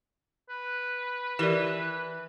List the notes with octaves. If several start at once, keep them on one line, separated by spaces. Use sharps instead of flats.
B4
E3 G4 A#4 D5